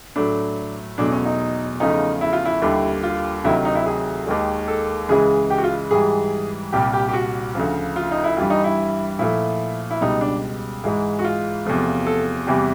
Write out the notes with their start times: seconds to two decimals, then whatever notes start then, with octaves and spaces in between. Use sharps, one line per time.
0.16 A2 F#3 A3 D4
0.98 E2 B2 F#3 A3 D4
1.12 C#4
1.25 D#4
1.80 E2 C#3 F3 A3 D#4
2.21 E4
2.33 F4
2.45 E4
2.62 D#2 D3 G3
3.03 F4
3.44 D2 C3 D#3 F#3 E4
3.65 D#4
3.75 E4
3.86 G#4
4.27 D#2 D#3 G#3
4.68 A4
5.09 C#2 C#3 E3 G#3 G#4
5.50 G4
5.58 F#4
5.64 F4
5.91 G#2 E3 G3 G#4
6.73 C2 A#2 G3 G4
6.93 G4
7.09 G4
7.13 F#4
7.55 D2 C#3 F3
7.96 F4
8.11 D#4
8.24 E4
8.37 G2 E3 G3 F4
8.50 D#4
8.64 E4
9.19 A#2 F3 A3 E4
9.91 E4
10.01 C#2 B2 G3 D#4
10.21 D4
10.84 G#2 E3 G#3
11.19 F#4
11.24 F4
11.66 E2 C3 F3 A3
12.07 A4
12.47 E2 C3 E3 G3 G4